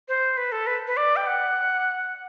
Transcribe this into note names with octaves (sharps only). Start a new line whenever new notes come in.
C5
B4
A4
B4
B4
D5
G5
F#5